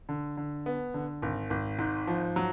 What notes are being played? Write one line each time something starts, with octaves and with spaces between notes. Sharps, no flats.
D3
D3
B3
D3
G#1
G#1
G#2
F3
F#3